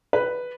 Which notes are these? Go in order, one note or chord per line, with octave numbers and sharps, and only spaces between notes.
B4